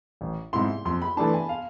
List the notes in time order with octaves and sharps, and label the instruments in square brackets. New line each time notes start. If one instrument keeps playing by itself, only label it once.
[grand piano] A1
[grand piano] G#2 G#3 C4 E4 [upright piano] C6
[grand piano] F2 [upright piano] C6
[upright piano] B5
[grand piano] E3 A3 D4 [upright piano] A5
[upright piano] G#5
F5